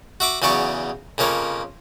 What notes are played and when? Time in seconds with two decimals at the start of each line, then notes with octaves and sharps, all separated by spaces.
0.20 F#4 E5 D6
0.42 E2 C#3 F#3 D5 C#6
1.18 F2 C#3 A#3 C#5